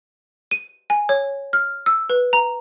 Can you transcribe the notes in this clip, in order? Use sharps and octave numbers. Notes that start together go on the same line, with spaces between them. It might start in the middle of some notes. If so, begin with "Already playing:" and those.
D#7
G#5
C#5
F6
E6
B4
A#5